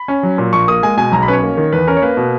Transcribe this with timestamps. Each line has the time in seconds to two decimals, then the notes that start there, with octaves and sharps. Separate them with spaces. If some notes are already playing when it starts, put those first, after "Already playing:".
Already playing: B5
0.08 C#4
0.23 F#3
0.38 A#2
0.53 A#1 C#6
0.68 A#3 D#6
0.83 G#3 G#5
0.97 B2 G#5
1.12 B1 A#5
1.23 B5
1.28 C#4 B4
1.33 C#5
1.43 A#3
1.57 D#3
1.72 E2 B4
1.87 C#4 A#4
1.96 C#5
2.02 A#3 B4
2.17 B2